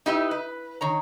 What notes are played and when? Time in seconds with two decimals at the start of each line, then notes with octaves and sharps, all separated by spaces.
0.06 D#4 E4 G4 B4 D#5 E5
0.31 B4
0.81 D#3 C#5 A#5